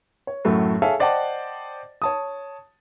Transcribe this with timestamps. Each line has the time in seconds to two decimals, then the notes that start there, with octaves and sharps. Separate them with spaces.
0.27 C#5
0.45 F#2 A2 F#3 A3
0.82 G#4 A4 C#5 E5 F5 G#5
1.00 C5 D5 D#5 F#5 G5 A5
2.02 C#5 A5 D#6